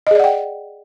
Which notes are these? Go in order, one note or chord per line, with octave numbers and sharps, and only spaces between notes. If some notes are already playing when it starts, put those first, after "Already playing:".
G#4 D5 D#5 F#5 G5